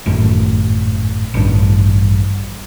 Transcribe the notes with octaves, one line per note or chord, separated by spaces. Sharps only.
G#1 F#2 A2
A1 G2